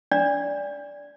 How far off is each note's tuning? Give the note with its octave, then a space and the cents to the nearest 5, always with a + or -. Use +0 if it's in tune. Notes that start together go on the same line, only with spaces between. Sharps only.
D4 -35 D5 -15